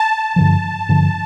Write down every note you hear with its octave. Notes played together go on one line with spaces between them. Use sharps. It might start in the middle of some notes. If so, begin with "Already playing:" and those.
Already playing: A5
G2 D3 F3
G2 D3 F3